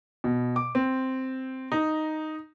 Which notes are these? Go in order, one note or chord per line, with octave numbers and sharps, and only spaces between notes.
B2
D6
C4
D#4